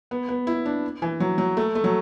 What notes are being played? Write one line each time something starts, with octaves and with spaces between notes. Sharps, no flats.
B3
B3
E4
D4
E3
F#3
F#3
A3
A3
F#3